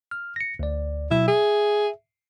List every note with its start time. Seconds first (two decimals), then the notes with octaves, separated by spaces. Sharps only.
0.11 F6
0.36 A#6 C#7
0.59 D2 D5
1.11 B2 F#3 E4 E6
1.28 G#4 E5